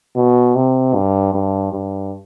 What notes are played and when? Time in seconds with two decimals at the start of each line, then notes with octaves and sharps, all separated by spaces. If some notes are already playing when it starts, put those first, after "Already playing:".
0.16 B2
0.55 C3
0.95 G2
1.34 G2
1.73 G2